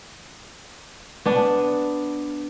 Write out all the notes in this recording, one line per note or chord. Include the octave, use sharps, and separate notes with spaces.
B3 D4